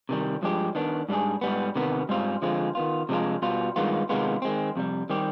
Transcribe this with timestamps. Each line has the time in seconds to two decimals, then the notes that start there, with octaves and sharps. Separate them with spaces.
0.09 C3 D#3 G3
0.42 G2 F3 G#3 D4 G4
0.75 D#3 B3 D4
1.09 G#2 G3 D4 G#4
1.41 G#2 G3 B3
1.75 C3 D#3 B3
2.09 G#2 G3 C4 F4
2.42 D3 F3 G#3 C4 F4
2.75 D#3 B3 F4
3.09 C3 F3 G#3 D4 F4
3.42 B2 G3 B3 F4
3.76 G2 D#3 G#3 B3 F4
4.09 C3 D#3 G#3 B3 F4
4.42 D#3 G#3 C4
4.76 F2 C3 G3
5.10 D#3 G3 C4 G4